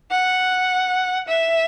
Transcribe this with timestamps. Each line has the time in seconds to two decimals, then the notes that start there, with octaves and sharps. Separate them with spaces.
0.11 F#5
1.29 E5